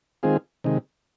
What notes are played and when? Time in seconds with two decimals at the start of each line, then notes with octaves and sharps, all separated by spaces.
0.23 D#3 G#3 C4 F4 G#4
0.64 C3 D#3 G#3